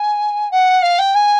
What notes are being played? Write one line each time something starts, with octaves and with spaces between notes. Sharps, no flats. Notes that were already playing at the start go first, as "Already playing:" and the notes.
Already playing: G#5
F#5
F5
G5
G#5